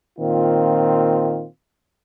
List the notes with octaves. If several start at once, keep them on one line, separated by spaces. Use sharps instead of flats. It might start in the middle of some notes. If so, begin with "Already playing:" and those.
A#2 D#3 C4 F4